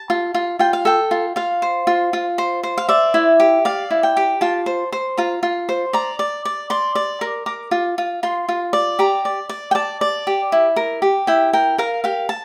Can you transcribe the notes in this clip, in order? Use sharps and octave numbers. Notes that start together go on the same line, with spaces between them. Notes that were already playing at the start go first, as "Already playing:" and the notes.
Already playing: A5
F4
F4
F4 G5
F5
A4 G5
F4
F4 F5
C5
F4
F4
C5
C5
F5
D5 E5
E4
G4
D5 F5
E4
G5
G4
F4 A5
C5
C5
F4 A#5
F4
C5
D5 A#5
D5
D5
D5 C6
D5
A#4
A#4 D6
F4
F4
F4 C6
F4
D5
G4 A#5
D5
D5
G5
D5 A5
D5
G4
E4
A#4
G4
E4 G5
A#4 G5
A#4 F5
G4 F5
A5